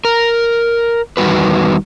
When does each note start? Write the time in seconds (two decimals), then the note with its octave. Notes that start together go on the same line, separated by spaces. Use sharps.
0.05 A#4
1.17 E2 D#3 G3 F#4 B4